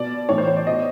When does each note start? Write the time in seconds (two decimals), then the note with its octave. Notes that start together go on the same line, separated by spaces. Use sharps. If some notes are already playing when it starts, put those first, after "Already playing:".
Already playing: B2 D5
0.29 A2 E3 C#5
0.38 C5
0.48 C#5
0.57 D5
0.67 B2 D#5